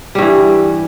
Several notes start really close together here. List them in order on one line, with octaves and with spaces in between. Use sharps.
G3 G2 E3